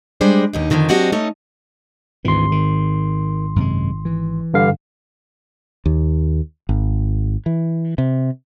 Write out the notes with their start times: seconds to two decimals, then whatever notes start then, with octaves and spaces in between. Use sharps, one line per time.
0.21 G3 G#3 D4 C5
0.53 D#2 B2 D#4
0.70 F2 A#2 D3 D#3 F3
0.89 F#3 C4 D4 F#4 G4 D#5
1.12 A3 C#4 D#4
2.25 G#1 D2 E3 C6
2.52 D#3
3.56 F#2 C3 G#3
4.05 E3
4.54 G2 D3 F5
5.86 D#2
6.69 G#1
7.46 E3
7.98 C3